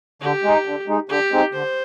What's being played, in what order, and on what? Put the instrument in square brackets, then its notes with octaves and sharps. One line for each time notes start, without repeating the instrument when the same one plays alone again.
[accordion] D3 [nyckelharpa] G4
[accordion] G#3 D#4
D3
G#3 D#4
[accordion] D3 [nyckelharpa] G4
[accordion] G#3 C4 D#4
[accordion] D3 [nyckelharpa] C5